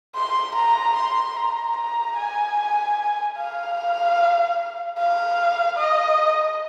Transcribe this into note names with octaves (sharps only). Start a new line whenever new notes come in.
C6
A#5
C6
A#5
A#5
G#5
F5
F5
D#5